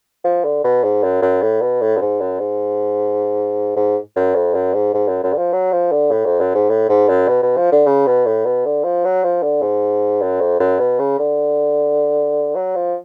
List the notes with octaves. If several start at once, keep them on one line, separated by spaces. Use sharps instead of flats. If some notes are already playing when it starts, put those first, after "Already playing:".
F3
D3
B2
G#2
F#2
F#2
A2
B2
A2
F#2
G#2
F#2
G#2
G#2
F#2
F2
F#2
G#2
G#2
F#2
F#2
D3
F3
F#3
F3
D3
A2
F2
F#2
G#2
A2
G#2
F#2
B2
B2
F3
D3
C#3
B2
A2
B2
D3
F3
F#3
F3
D3
G#2
F#2
F2
F#2
B2
C#3
D3
F#3
F3